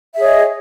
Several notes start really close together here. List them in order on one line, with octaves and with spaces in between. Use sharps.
E5 G#4 C#5 D#5